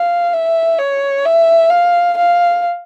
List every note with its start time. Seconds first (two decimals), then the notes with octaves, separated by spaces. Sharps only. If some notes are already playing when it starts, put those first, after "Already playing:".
Already playing: F5
0.33 E5
0.79 C#5
1.25 E5
1.70 F5
2.17 F5